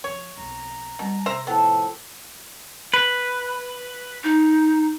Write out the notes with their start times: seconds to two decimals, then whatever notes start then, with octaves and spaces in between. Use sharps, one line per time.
0.04 D#3 F3 C#5
0.37 B1 F2 A#5
0.99 B2 G3 C#4
1.26 C3 C5 E5 A#5
1.47 A2 F3 B3 A4 G5 A5
2.94 B4
4.24 D#4